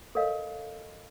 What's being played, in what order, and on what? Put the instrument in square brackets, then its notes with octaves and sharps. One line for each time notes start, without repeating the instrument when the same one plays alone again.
[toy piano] A4 A#4 C#5 D#5 F5